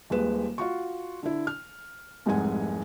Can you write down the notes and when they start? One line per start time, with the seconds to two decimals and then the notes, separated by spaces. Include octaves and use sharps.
0.10 D#1 D#2 G#3 B4 E7
0.58 F4 F#4 C#6
1.23 D3 E4
1.47 F6
2.26 F1 C2 G#2 G#3 F#5 G#5